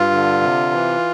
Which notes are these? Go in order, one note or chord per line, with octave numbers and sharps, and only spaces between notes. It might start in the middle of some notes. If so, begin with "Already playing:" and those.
Already playing: G2 F4
D3
C3
E3